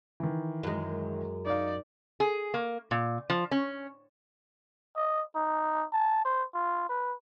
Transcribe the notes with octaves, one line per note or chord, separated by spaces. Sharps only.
D#3 E3
F#2 G#3
D#4 D5 F5
G#4
A#3
A#2
F3
C#4
D#5
D#4
A5
C5
F4
B4